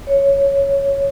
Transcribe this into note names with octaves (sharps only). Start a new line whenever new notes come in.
C#5